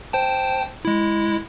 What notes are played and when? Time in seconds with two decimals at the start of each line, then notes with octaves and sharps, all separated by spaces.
0.13 C5 G5 A5
0.85 G#3 E4